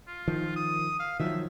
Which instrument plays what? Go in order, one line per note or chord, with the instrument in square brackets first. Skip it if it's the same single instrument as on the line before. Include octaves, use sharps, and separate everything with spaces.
[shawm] F4
[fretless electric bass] D#3 F3
[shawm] D#6
F5
[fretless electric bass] D#3 F3 F#3 [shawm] E5